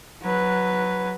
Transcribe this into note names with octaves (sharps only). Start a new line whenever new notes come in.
F#3 B4